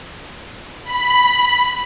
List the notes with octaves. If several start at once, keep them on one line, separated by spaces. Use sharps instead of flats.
B5